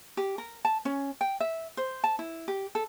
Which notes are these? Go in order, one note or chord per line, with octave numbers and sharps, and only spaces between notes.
G4
A#4
A5
C#4
G5
E5
C5
A5
E4
G4
A4